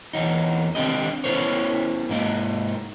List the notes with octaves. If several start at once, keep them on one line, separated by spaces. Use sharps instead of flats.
E2 G2 F#3 D#4
D#3 C4 D4 G4 D#5
B3 C#4 E4 A#4 C5 C#5
G#2 A#3 D#4